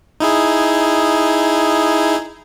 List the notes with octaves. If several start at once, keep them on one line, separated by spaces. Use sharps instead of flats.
D#4 E4 G#4